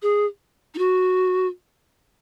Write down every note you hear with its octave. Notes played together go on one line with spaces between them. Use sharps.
G#4
D#4
F#4